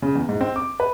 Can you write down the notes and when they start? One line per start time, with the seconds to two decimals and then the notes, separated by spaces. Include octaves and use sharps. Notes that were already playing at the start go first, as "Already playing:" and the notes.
0.02 C#3
0.15 E2
0.29 G#2
0.41 C4
0.56 D6
0.80 B4